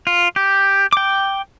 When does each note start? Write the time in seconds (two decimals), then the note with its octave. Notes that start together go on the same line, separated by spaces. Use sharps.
0.07 F4
0.36 G4
0.93 G5 D6